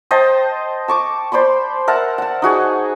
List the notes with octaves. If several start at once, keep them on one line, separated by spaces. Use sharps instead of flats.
C5 D#5 G5 A5
A5 C#6 D6
C5 D5 B5 C6
A#4 E5 F#5 A5
F#5 A5
D#4 F#4 G#4